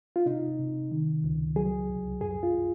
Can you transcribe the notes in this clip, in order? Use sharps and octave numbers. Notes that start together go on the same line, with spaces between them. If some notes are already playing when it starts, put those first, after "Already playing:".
F4
C3 D#4
C3
D#3
C#2
F#3 G#4
C2
F#2 G#4
F4